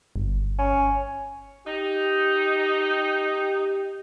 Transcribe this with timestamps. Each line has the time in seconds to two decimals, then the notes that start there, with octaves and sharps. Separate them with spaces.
0.16 G1
0.58 C#4
1.67 D#4 G4